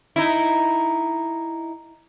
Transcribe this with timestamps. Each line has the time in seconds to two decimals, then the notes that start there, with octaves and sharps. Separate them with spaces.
0.16 D#4 E4